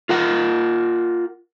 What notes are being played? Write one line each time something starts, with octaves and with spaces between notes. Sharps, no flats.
F4 A#4 F#5